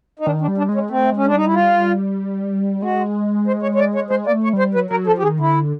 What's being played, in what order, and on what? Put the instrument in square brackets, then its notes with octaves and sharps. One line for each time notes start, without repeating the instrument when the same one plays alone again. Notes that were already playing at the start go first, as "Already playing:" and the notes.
[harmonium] D#4
[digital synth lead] D#3 [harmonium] D4
[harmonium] D4
[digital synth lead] G3
[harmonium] D4
[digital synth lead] G#3
[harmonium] C#4
[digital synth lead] A3 [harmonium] C4
[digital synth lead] G#3 [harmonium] C#4
[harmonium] D4
[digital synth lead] G3 [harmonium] D#4
[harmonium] E4
F4
[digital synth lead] G#3 [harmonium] F#4
[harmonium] C5
C#5
C#5
D5
C#5
[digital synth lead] G#3 [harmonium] C5
[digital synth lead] A#3 [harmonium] D5
[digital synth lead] A3
[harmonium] C#5
[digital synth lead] G3
[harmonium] C5
[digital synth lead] F#3 [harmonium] B4
[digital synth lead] F#3 [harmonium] A#4
[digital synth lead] F3 [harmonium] A4
[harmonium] G4
[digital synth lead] D#3 [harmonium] G#4
[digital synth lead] D3 [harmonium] E4